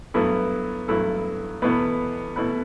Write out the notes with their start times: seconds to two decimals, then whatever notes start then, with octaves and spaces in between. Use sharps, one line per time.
0.14 G2 F#3 A3 B3 E4 A4
0.88 G2 F#3 A3 E4 A4
1.62 E2 B2 A3 B3 E4 B4
2.36 B2 A3 E4 B4